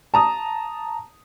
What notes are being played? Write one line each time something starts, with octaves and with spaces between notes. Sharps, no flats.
A5 A#5 D#6